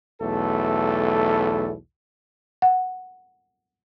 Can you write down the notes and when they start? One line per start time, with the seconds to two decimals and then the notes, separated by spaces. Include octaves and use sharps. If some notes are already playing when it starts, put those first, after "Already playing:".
0.21 B1 E2 A3 A4
2.62 F#5